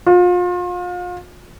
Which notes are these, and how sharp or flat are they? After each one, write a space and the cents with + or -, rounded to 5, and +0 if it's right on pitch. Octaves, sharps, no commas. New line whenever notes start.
F4 +35